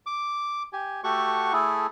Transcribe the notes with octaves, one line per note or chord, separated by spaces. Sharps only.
D6
G4 G#5
A3 F#4 G4 A4 F#5 C#6
A3 E4 G#4 A4